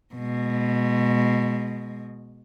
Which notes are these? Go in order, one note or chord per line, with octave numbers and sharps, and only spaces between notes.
B2 G#3